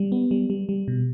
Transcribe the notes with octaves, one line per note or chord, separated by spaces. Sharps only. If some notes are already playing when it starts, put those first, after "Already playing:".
Already playing: G3
B3
G3
G3
G3
B2